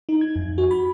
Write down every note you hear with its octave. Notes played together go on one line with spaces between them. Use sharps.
D#4
G#6
F2
F#4
B5